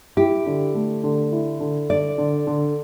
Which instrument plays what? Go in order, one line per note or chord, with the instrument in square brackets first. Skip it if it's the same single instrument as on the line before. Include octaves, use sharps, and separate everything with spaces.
[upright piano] E4 [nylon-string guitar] G4
[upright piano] D3
A3
D3
E4
D3
[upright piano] D3 [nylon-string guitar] D5
[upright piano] D3
D3